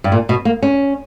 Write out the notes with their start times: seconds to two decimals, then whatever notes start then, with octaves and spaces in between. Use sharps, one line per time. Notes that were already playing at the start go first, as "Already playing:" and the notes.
0.04 G2
0.12 A#2
0.29 B2
0.45 A#3
0.63 C#4